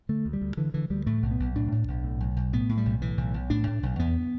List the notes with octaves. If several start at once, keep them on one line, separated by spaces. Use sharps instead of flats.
D3 A3
D2
G3
D2
D3 E3
D3 E3
D2 G3
A2 A3
B1
B3
B1
A2 D4
A2
B1
A2
B1
B1
A2 B3
A2
G3
B1
A2 E3
B1
B1
A2 D4
A2
B1
E2 B3